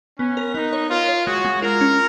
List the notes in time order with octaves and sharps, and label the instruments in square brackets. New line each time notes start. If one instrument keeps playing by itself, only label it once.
[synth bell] B3 [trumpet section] C#4
[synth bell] A#4
[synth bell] B3 [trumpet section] D#4
[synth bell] C#5
[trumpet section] F4 [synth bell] A#4
[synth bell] C#5
[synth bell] G#3 [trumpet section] F#4
[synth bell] G#3
[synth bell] F4 [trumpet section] A#4
[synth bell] C#4